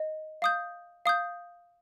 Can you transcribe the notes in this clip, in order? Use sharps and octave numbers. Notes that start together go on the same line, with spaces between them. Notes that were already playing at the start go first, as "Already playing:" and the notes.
Already playing: D#5
F5 D#6 G6
F5 D#6 G6